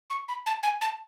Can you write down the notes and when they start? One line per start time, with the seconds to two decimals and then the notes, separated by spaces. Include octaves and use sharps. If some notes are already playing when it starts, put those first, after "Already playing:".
0.10 C#6
0.28 B5
0.46 A5
0.63 G#5
0.81 A5